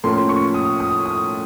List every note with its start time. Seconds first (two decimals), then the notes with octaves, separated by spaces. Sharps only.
0.04 A2 F3 A#3 C#4 C6
0.29 C#6
0.54 D#6
0.80 D#6
1.06 D#6